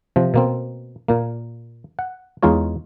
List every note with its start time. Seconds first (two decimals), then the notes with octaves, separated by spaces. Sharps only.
0.16 C3 F3
0.34 B2 A#3 C4
1.08 A#2 A#3
1.99 F#5
2.43 E2 G#3 D#4 F4 C#5